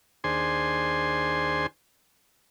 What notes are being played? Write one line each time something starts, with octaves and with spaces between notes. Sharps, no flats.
D#2 D4 G#4 C5 G#5 C6